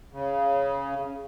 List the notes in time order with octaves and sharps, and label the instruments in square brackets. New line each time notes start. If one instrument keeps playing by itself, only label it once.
[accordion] C#3